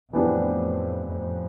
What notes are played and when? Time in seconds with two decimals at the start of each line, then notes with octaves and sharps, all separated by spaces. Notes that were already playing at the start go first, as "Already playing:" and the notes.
0.13 F2 A2 E3 B3 D4 G4
1.09 F2 A2